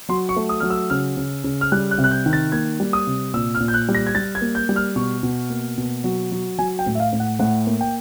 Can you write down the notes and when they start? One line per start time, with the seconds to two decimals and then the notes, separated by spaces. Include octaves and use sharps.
0.09 F#3 C6
0.29 C#6
0.36 A3
0.49 D#6
0.60 F#3 F6
0.70 E6
0.90 C#3 F6
1.17 C#3
1.44 C#3
1.61 F6
1.72 G3 F#6
1.91 F#6
1.98 C3
2.04 F#6
2.11 G6
2.26 D#3
2.33 A6
2.52 A#3 G#6
2.80 G3
2.93 D#6
3.07 C3
3.34 A#2 E6
3.55 F6
3.60 A#2
3.68 G6
3.74 F#6
3.89 G3
3.95 A#6
4.07 G#6
4.15 G3 A6
4.35 G#6
4.41 A#3
4.55 G6
4.69 G3
4.76 F6
4.96 B2 C#6
5.23 B2
5.50 A#3
5.78 B2
6.04 F#3
6.32 F#3
6.58 F#3 G#5
6.79 G5
6.86 A2
6.95 E5
7.00 F5
7.13 A2
7.20 F#5
7.39 A2 F#5
7.67 A#3
7.81 G5